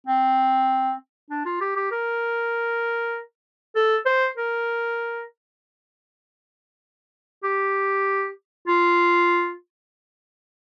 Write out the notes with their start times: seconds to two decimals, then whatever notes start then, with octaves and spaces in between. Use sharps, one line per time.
0.07 C4
1.30 D4
1.45 F4
1.61 G4
1.76 G4
1.92 A#4
3.76 A4
4.06 C5
4.38 A#4
7.43 G4
8.67 F4